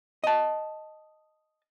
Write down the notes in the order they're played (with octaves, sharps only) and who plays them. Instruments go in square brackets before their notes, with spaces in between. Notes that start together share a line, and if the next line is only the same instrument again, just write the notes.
[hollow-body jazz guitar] D#5 A5